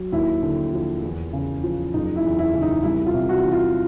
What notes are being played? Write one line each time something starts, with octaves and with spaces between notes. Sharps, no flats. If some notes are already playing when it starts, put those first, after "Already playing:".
Already playing: F#3
D#2 E4
D3
F3
E2
C#3
F3
F#1 D#4
E4
E2
E4
C#3
D#4
C2 E4
F4
C3
F#4
E3
F4